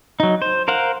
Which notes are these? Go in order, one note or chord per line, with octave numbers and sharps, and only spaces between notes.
F#3 D#4
C5
A#4 C5 F5 F#5